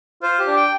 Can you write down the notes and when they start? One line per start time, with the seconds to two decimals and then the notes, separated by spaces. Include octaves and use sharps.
0.23 F4 C5
0.39 G4
0.47 D4
0.56 G5